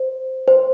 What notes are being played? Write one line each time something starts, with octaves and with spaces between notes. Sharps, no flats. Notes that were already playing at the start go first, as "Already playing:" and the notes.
Already playing: C5
C5